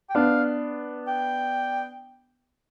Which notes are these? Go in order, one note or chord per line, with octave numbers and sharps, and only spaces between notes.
G5
B3 D4 F5
G5